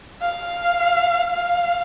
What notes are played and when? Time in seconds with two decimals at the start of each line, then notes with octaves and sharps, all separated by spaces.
0.21 F5
1.32 F5